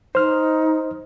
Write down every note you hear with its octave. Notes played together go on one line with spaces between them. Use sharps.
D#4 C5 F6